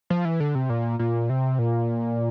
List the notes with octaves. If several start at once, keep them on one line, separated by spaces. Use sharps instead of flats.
F3
E3
D3
C3
A#2
A#2
C3
A#2